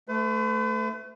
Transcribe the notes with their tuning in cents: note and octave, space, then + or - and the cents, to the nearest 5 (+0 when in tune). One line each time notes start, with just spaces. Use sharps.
A3 +0 B4 +45